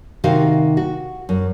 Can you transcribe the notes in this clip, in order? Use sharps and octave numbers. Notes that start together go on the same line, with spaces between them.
C3 D#3 D#4 F#4 D#5 F5
F#4
F#2